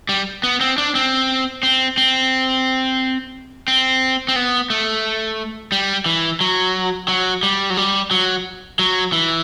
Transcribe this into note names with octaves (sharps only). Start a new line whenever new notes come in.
G3
B3
C4
D4
C4
C4
C4
C4
C4
B3
A3
G3
E3
F#3
F#3
G3
F#3
G3
F#3
F#3
E3